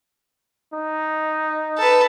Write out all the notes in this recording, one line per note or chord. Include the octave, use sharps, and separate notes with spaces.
D#4
A4 B4